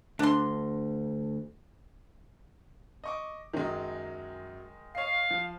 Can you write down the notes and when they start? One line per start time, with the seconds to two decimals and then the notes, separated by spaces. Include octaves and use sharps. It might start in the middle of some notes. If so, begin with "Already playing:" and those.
0.19 D2 D4 C6
3.04 D#5 C#6 D6
3.53 F#2 D#3 F#3 G#3
4.95 C#5 D#5 F5 C7
5.31 F3